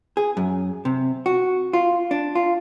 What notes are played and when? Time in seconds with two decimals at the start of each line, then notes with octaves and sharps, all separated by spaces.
0.17 G#4
0.37 F#2
0.85 C3
1.26 F#4
1.73 F4
2.11 D4
2.35 F4